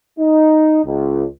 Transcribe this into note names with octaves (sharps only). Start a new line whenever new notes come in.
D#4
C#2